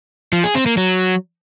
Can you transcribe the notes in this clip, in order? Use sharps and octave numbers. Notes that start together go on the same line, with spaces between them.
F3
G#4
C4
A#3
F#3